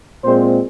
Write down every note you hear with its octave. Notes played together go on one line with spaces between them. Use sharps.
A#2 G#3 C4 C5